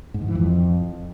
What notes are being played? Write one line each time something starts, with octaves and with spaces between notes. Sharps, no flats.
G#2
D#3
E3
F2